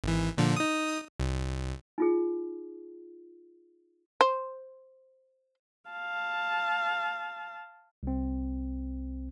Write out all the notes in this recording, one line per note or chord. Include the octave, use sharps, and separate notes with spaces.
G#1 E3
A#2 D3 F3
D#4 D#6
C2
D#4 F4 G#4
C5
F5 A5
C2 C4